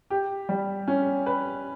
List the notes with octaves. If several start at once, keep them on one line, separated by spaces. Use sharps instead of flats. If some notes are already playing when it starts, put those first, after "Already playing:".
G4
G3
C#4
B4